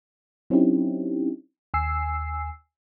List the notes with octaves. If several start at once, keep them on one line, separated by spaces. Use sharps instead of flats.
F#3 C4 C#4 D#4 E4 G4
D#2 G#5 E6 C7